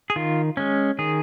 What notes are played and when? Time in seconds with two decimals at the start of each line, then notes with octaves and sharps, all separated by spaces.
0.10 G#4
0.16 D#3 F4
0.57 G#3 C#4
0.99 D#3 G#4